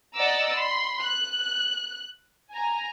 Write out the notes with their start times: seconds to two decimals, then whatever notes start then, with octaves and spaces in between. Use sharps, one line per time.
0.16 D5 D#5 F#5 A#5 D6 E6
0.57 B5 C6
1.02 F#6
2.53 G#5 A#5